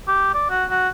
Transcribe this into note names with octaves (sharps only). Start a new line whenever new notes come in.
G4
D5
F#4
F#4